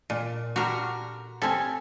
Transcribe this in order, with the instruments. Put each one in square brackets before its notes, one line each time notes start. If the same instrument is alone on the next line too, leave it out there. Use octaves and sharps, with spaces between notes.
[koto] A#2
[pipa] D3 G3 A#4 [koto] F#4
[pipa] G3 G#5 [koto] C4 A4